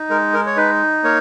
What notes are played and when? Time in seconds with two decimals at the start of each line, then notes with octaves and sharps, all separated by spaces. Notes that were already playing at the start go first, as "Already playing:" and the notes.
Already playing: D#4
0.10 G#3 A#4
0.34 A#4
0.46 C#5
0.56 D#4 B4
1.04 A#3 C#5